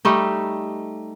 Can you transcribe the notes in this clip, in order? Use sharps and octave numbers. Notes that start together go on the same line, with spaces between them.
G3 A3 D#4